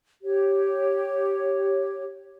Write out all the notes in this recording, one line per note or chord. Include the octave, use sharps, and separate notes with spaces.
G4 C#5